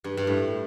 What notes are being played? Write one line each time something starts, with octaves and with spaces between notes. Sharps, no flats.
G2
G2
A2